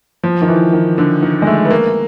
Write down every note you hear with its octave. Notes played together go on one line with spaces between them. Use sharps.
F3
D#3
E3
D#3
D3
D#3
G#3
A3
B3
A#3